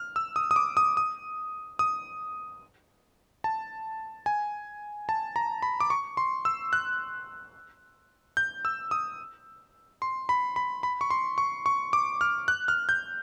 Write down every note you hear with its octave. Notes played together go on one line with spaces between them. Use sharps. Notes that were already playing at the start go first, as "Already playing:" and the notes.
Already playing: F6
E6
D#6
D#6
D6
D#6
D#6
D#6
A5
G#5
A5
A#5
B5
D6
C#6
C6
E6
F#6
G6
E6
D#6
C6
B5
B5
B5
C#6
C6
C#6
C#6
D6
F6
F#6
F6
G6